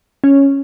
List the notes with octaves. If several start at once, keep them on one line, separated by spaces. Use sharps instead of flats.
C#4